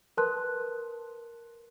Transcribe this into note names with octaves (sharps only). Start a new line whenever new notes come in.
A#4 B4 A5 C6 F#6